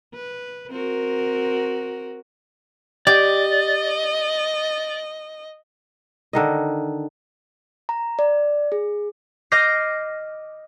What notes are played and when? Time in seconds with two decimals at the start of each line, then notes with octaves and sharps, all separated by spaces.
0.14 B4
0.70 C4 F#4 A#4
3.07 G4 D5 D#5
6.33 D3 D#3 D#5
7.89 A#5
8.19 D5
8.72 G#4
9.52 D#5 D6 F6 G6 A#6 C7